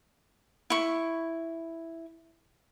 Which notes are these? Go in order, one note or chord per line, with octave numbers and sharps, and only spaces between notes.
E4 C#6